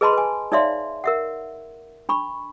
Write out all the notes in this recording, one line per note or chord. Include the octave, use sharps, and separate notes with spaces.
G#4 B4 D#5 A5 B5 C6
B4 G#5
D#4 C#5 D5 E5 F5 C6
A#4 E5 F#5
D4 B5 C#6